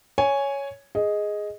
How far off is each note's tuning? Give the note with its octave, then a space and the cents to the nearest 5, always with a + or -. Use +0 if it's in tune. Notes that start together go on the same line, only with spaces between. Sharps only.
C#5 +5 G#5 +0
G#4 +0 D#5 +5